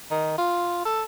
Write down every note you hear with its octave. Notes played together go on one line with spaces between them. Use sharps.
D#3
F4
A4